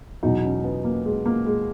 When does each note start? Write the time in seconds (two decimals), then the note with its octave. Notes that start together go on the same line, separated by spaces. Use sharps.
0.23 E2 B2 F#3 D#4
0.44 C#4
0.64 B3
0.84 A#3
1.06 G#3
1.26 A#3
1.46 G#3